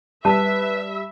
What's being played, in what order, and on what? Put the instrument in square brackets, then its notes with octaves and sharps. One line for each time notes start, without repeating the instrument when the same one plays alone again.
[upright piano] G3 [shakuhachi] B4 [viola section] E5 [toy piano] A5